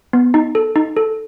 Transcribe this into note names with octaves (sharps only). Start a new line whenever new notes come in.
B3
D#4
A4
D#4
A4